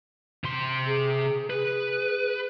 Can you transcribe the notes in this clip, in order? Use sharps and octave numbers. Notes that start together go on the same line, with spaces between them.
C3 C6
G#4
G#4 B4